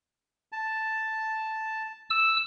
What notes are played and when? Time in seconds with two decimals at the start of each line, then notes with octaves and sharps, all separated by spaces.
0.52 A5
2.10 E6